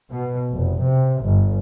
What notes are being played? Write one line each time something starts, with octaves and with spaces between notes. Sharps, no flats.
B2
F1
C3
G1